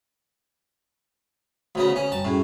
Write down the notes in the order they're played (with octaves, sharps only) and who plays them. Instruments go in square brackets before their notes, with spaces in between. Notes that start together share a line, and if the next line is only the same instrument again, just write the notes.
[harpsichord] D2 C#3 B3
[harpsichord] C#4 [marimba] G#5
[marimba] F#2 G3 [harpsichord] A5
[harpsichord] A2 [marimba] C#4 F#4 G#4